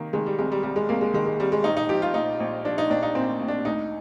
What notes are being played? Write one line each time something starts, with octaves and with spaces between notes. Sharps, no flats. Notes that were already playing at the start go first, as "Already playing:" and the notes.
Already playing: C3 D#3 A#3
D#3 G#3
G3
C2 G#3
G3
C2 G3
G#3
C2 A#3
G#3
D#3 G#3
G#3
C2 G3
G#3
A#1 D#4
D#4
F3 G4
F4
A#1 D#4
A#1
F3 D4
D#4
A#1 D4
D#4
A#2 C4
A#1
D4
D2 D#4